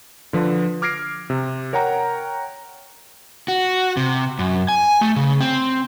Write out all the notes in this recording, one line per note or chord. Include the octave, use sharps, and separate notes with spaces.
D3 F3 B4
D6 F6 G#6 A#6 C7 D7
C3
A#4 C#5 F#5 G5 A#5
F#4
C3
F#2
G#5
A3
C#3
C4